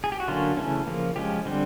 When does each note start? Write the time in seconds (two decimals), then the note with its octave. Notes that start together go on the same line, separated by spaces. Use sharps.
0.04 G#4
0.12 G4
0.20 F#4
0.28 D3 F#3 A#3 C#4 F4
0.57 C#3 E3 A3 C#4
0.87 C#3 F3 A#3
1.16 F3 G#3 C#4 G4
1.45 D3 G3 C4